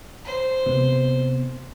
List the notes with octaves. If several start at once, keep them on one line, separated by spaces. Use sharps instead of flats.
C5
C3 B3